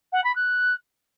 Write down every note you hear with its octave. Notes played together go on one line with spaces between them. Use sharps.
F#5
B5
F#6